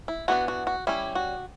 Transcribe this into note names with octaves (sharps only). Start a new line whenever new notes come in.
E4
E3 B3 D4 F#4
F#4
F#4
G3 C#4 E4
F#4